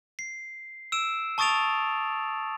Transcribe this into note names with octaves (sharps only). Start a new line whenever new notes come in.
C7
E6 D7 E7
A5 C#6 D#6 A6 D7 F7